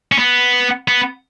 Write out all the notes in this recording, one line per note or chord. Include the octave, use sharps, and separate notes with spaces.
C#4
B3
B3